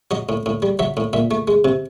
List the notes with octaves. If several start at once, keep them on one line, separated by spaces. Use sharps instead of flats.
F#3 D#5
A2
A2
G3
F#3 E5
A2
A#2 E5
A3
G#3
C3